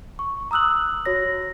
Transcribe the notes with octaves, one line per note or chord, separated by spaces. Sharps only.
C#6
A#5 D#6 E6 F#6 F#7
F#4 C#5 A#6